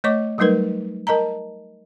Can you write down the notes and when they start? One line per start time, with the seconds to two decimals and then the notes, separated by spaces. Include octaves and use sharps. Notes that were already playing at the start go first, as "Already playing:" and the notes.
0.04 A3 C#5 D#5 C#6 D6
0.38 F#3 G3 A3 D#4 A#4 B4
1.07 A#4 D#5 A5 A#5